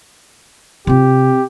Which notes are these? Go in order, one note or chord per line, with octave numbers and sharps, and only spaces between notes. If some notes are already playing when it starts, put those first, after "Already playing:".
C3 C4 F4 G4